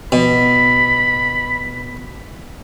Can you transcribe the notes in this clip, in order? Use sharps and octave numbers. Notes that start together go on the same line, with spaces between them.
B2 B5